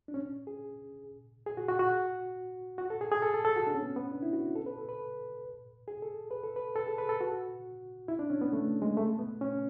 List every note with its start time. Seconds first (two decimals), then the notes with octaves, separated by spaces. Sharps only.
0.08 D4
0.14 C#4
0.47 G#4
1.46 G#4
1.57 F#4
1.68 F#4
1.79 F#4
2.78 F#4
2.90 A4
3.01 G#4
3.12 G#4
3.22 A4
3.34 A4
3.45 A4
3.56 F#4
3.67 D4
3.75 C#4
3.82 B3
3.96 B3
4.11 D4
4.22 E4
4.33 F#4
4.56 A4
4.66 B4
4.78 A4
4.89 B4
5.88 G#4
6.02 A4
6.31 B4
6.44 A4
6.56 B4
6.76 A4
6.87 G#4
6.98 B4
7.09 A4
7.21 F#4
8.08 E4
8.19 D4
8.30 C#4
8.41 B3
8.53 A3
8.82 G#3
8.97 A3
9.19 B3
9.41 C#4